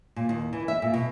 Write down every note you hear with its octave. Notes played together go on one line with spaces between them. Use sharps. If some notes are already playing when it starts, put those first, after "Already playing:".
A#2
D#2
E3
E5
A#2
B2